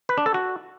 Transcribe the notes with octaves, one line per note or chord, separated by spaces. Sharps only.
B4
D4
A4
F#4